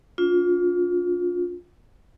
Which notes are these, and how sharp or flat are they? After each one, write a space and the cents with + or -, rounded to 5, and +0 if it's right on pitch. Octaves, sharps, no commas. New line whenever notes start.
D4 -40 F4 +20